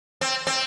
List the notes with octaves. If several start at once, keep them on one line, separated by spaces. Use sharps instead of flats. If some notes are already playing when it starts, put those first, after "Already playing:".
C4
C4